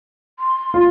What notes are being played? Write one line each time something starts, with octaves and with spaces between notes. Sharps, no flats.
C6
F4